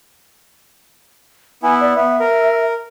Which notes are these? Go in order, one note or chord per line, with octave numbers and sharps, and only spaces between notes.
B3 E4 G#5
D5
B3 E5
A#4